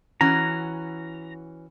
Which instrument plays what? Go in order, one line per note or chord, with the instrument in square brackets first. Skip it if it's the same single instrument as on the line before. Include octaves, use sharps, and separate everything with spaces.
[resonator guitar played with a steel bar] E3 C#4 F#4 [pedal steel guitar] A#5